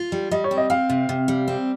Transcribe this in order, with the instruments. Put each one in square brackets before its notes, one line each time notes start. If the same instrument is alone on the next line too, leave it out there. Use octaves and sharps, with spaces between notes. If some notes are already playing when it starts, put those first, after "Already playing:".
Already playing: [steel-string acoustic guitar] F4
G3
[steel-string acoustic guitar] G3 [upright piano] D#5
[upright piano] C#5
[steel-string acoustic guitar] C4
[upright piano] D#5
[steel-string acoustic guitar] C4 [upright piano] F5
[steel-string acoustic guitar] C3
C3
G3
C4